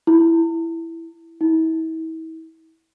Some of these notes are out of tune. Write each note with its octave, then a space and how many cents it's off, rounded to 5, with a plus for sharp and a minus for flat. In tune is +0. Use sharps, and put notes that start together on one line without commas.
E4 +5
E4 -40